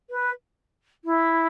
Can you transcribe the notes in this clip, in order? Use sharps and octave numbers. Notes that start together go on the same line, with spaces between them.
B4
E4